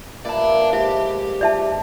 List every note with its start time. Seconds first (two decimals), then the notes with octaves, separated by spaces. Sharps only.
0.25 A#2 E4 B4 D5 A5
0.73 G#2 G4 E5
1.41 D5 E5 A5